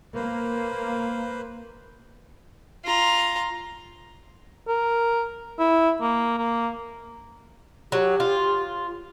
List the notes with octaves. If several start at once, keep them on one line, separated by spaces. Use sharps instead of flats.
A#3 B4 C5
F4 A#5
A#4
E4
A#3
A#3
F#3 G4
F4